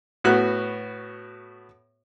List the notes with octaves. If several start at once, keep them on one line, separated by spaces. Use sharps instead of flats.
A2 B3 F#4 F#6